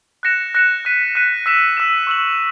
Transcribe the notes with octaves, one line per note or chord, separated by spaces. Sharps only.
F#6 A#6 C#7 E7
F#6 A#6 C#7 E7
F#6 B6 D#7
F#6 B6 D#7
E6 B6 E7
E6 B6 E7
C#6 E6 B6 F#7